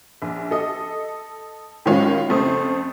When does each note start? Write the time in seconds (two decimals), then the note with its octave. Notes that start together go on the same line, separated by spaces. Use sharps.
0.22 A#1
0.51 A4 D#5
1.86 A2 D#3 F#3 G#3 C#4 F4
2.29 F2 C#3 A3 C5 D#6